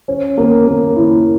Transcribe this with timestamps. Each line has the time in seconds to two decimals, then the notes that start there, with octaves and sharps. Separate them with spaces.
0.08 C#4
0.37 A#3
0.67 A#3
0.96 E4